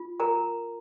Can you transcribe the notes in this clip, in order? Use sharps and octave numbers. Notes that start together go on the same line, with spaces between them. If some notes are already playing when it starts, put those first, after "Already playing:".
Already playing: F4
A#4 A#5